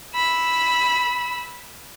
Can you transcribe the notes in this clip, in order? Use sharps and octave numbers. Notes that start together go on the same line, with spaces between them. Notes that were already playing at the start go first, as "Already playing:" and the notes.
B5 E6